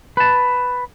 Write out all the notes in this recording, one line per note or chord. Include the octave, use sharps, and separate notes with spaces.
B4 A5